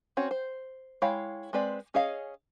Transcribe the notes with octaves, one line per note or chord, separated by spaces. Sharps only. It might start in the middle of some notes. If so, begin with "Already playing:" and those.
C4 C#4 F#4 C#5
C5
G#3 E4 C#5 F5 G5
G#3 C4 B4 D5
C#4 G#4 C#5 D#5 F5